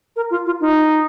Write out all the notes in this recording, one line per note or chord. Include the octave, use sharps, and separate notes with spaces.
A#4
F4
F4
D#4